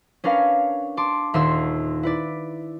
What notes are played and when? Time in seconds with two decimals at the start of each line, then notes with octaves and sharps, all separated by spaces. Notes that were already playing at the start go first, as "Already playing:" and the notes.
0.24 C#4 D4 A#4 B4 C#5 F5
0.97 A5 C6 D6
1.34 D#1 D#2 E5 C6 E6 E7
2.03 E4 B4 D5